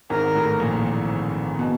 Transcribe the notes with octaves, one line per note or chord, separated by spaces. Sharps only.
G#1 G#2 A#4
A1 A2
A#1 A#2
B2